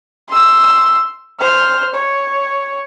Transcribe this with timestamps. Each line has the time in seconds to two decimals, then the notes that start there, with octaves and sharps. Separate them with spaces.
0.29 C6 E6
1.40 C5 F6
1.95 C#5